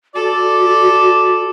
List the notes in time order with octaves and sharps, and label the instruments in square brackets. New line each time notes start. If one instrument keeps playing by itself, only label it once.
[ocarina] F#4 [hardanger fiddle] A4 [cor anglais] D5